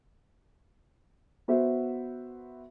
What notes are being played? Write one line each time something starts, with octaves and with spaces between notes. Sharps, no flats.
B3 F#4 C5 E5